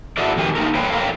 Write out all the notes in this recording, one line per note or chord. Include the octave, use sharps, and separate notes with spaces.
E4 F#4 G#4 A4 D5 D#5
F2 D#3 G4 G#5
A#3 D#4 A4 A#4
A4 B4 C#5 F5 G5
A4 A#4 C#5 G5 G#5 A#5